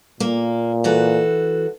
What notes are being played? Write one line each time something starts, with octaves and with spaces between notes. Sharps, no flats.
A#2 A#3
E3 F#4 A4